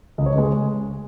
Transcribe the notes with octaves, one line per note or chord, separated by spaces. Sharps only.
C#2 D#5
C#5
C#3 G#3 G#4 B4